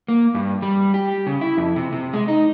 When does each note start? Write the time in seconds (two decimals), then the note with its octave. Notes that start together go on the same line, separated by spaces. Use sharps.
0.08 A#3
0.35 G2
0.62 G3
0.94 G4
1.27 C#3
1.41 E4
1.58 F2
1.76 C3
1.92 C3
2.13 G#3
2.28 D#4